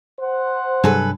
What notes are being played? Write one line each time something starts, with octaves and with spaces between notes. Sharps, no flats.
C5 F#5
G2 C3 F#3 G#4 A4 B4